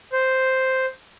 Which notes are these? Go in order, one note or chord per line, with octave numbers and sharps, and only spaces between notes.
C5